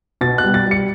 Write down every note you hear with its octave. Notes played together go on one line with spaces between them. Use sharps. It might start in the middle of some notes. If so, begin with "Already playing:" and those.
B2 A6
F#6
G3
A6
G3
C#7